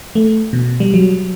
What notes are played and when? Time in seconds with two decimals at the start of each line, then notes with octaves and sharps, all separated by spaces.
0.15 A3
0.53 B2
0.80 G3
0.94 F#3